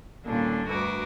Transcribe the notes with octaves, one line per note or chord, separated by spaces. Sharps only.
D#2 A#2 D3 G3 C#4 D4
D2 G2 F#4 A#4 B4 D6